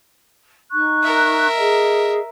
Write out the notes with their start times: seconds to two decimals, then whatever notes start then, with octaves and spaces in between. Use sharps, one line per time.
0.71 D#4 C#6 F#6
1.03 A#4 E5
1.56 G#4 D#5